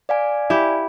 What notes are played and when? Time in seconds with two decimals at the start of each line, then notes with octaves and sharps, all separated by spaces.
0.09 D5 F5 G#5
0.50 E4 G4